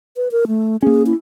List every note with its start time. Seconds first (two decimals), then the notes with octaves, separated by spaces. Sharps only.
0.17 B4
0.32 A#4
0.48 A3
0.82 A#3 C#4 G#4
1.06 E4